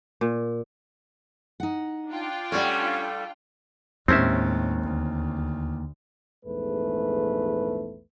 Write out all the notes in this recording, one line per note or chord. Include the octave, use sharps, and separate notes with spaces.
A#2
D#4 F#5
D4 F4 G5
G3 A3 C#4 D5 F5 F#5
D#2 A2 G#3 C4 C#4 E5
D2
A#1 E2 G#2 A3 B4